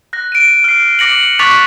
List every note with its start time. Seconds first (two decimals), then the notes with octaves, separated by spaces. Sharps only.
0.13 F#6 A#6
0.32 D7 D#7
0.64 F6 C7
0.99 D6 A#6 C#7 F#7
1.39 C#6 D6 F#6 A6 B6 F7